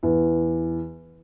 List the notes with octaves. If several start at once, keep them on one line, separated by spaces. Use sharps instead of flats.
E2